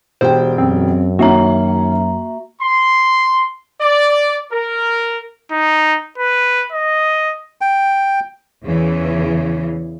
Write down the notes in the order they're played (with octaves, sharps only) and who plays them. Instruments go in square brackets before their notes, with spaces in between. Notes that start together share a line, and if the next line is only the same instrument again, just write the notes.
[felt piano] E1 G4 G5 [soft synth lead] C5
[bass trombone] F#2 [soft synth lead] C4
[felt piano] D#3 C#4 [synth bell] A#3 E5 A#5 [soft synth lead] F#4
[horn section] C6
D5
A#4
[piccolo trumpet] D#4
B4
D#5
[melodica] G5
[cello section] E2 C#3 E3